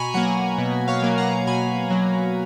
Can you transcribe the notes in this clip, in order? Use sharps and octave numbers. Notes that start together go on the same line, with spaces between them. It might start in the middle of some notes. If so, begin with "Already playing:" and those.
Already playing: B2 G#5 A#5 B5 C#6
F#3 A#3 F#5 A#5
B2
C#5 F5
F#3 A#3
F#5 A#5
B2 G#5 B5
F#3 A#3